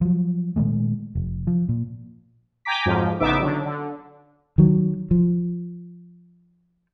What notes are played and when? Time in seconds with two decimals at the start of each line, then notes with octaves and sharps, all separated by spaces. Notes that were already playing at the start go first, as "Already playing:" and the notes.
0.01 F3 F#3
0.56 A#2 D#3 G#3 A3
1.15 F1
1.47 F3
1.69 A#2
2.65 G5 G#5 A#5 D6 B6
2.86 F2 G#2 F3 F#3
3.20 A1 C#3 B3 D#4 E5 D6
3.40 D3 F#3
3.66 D3
4.58 D#3 F#3
5.11 F3